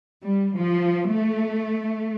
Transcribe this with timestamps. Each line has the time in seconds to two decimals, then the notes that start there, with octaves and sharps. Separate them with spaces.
0.23 G3
0.57 F3
1.10 A3